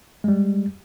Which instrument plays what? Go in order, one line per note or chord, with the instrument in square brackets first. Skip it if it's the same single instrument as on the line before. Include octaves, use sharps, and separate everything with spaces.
[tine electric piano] G3 G#3